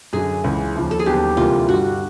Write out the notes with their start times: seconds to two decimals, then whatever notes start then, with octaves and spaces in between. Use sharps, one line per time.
0.13 F#2 D3 F#3 G#4
0.44 C#2 C#3 E3
0.76 D#2 C#3 F3
0.91 A4
0.99 G#4
1.06 D#2 D3 F#3 B3 G4
1.37 D2 C3 E3 G3 A#3 F4
1.68 G2 D3 G3 F#4